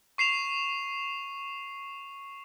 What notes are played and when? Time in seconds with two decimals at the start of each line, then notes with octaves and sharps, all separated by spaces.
0.18 C#6 C7 E7 F7